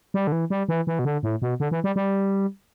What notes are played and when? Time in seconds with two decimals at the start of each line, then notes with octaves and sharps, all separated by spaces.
0.14 G3
0.27 D3
0.32 E3
0.50 G3
0.69 E3
0.87 E3
0.99 B2
1.05 D3
1.23 A2
1.42 B2
1.60 D3
1.71 E3
1.84 G3
1.96 G3